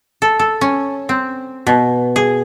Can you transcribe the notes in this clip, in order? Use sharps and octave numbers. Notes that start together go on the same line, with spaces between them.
A4
A4
C#4
C4
B2
G#4